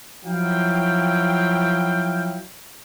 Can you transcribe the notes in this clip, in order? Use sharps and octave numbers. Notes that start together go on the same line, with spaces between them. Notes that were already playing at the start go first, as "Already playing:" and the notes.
F3 F#3 E4 F5 G5